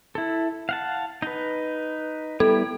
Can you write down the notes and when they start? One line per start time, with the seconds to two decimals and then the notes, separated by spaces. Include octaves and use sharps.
0.15 E4 A4
0.69 F5 F#5 A5
1.22 D#4 B4
2.40 G3 B3 E4 A4